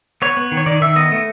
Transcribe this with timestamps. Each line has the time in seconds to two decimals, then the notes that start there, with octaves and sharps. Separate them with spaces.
0.22 B3 C#5
0.37 B3
0.52 D#3
0.57 C#5
0.66 D#3 D5
0.82 D#3 E5
0.96 B3 D#5
1.12 A3